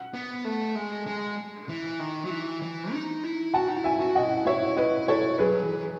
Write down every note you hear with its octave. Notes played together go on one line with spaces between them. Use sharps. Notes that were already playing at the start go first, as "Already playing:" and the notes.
Already playing: F#5
B3
A3
G#3
G#3
E3
D#3
F#3
E3
E3
D#4
E4
F#4 F#5 A5
D#4
E4
E5 G#5
F#4
D#5 F#5
E4
E4 C#5 E5
E4 B4 D#5
E4 A4 C#5
F#3 G#4 B4
E3